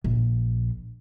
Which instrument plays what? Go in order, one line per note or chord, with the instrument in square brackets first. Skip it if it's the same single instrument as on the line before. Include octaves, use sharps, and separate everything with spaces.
[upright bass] A#1